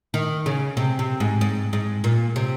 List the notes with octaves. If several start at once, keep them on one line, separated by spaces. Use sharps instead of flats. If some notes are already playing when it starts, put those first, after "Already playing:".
D#3
C#3
C3
C3
G#2
G#2
G#2
A#2
C3